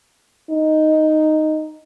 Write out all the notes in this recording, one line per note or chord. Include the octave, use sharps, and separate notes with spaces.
D#4